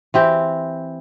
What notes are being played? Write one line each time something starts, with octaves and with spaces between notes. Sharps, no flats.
E3 C4 G4